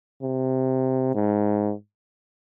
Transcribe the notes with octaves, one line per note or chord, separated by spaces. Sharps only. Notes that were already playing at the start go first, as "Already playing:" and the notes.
C3
G#2